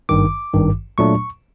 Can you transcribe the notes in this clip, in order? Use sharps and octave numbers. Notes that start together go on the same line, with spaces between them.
G#1 G2 D#3 D6
G#1 G2 D#3
A#2 F#3 A3 D4 C#6